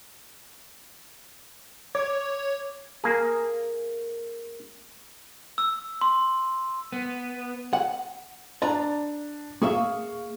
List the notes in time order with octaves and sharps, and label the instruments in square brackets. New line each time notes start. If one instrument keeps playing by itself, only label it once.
[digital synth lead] C#5 [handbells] D6
[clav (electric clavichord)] A#3 G#4
[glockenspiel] E6
C6
[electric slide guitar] B3
[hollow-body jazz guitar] F#5
[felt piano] D4 [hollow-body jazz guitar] D5 A#5
[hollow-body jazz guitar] A#3 G#4 E5 [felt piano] F5 C#6